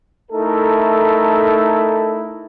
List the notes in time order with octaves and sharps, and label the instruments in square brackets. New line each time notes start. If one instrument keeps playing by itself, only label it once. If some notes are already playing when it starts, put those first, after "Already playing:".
[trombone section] A3 D#4 E4 A4 A#4